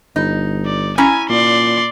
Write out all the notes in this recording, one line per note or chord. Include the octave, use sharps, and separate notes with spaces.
G1 D#4
D5
C#4 E4 G#5 A#5
A#2 D5 C6